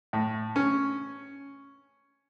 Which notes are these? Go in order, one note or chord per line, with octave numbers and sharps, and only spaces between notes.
A2
C#4